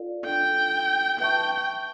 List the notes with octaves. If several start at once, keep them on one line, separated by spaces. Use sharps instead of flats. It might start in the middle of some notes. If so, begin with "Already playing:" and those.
Already playing: F4 A4 D5 F5
D4 F4 A4 G5
B4 E5 G5 A5 C#6